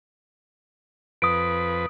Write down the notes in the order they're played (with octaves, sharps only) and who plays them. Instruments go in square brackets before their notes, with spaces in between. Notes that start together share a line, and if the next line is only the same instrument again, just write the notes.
[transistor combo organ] F2 B4 [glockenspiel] D#6 D7